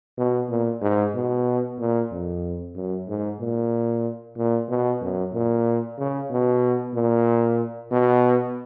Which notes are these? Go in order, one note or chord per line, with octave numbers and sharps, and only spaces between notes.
B2
A#2
G#2
B2
A#2
F2
F#2
G#2
A#2
A#2
B2
F#2
A#2
C#3
B2
A#2
B2